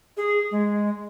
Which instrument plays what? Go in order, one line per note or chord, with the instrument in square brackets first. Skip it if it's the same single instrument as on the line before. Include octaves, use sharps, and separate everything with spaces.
[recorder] G#4
G#3